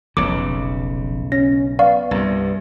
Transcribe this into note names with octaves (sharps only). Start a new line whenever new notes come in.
F1 B1 C#3 D6
C#4 A#6
B3 D5 F5 C#6
C2 G2